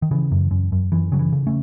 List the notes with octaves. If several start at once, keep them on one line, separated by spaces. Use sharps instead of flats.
D#3
C#3 E3
F#2
F#2
F#2
F#2 E3
C#3 F#3
E3
C#3
A3 C#4